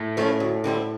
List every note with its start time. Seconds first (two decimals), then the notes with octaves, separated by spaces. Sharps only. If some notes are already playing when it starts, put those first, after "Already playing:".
Already playing: A2
0.17 F3 A3 C#4 E4
0.40 D2
0.64 D3 G3 C4 E4